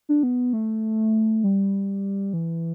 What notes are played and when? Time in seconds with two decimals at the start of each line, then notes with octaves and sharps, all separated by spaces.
0.09 D4
0.23 B3
0.53 A3
1.44 G3
2.33 E3